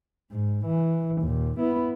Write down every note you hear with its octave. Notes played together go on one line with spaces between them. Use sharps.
G#2
E3
D#2 A#2
B3 E4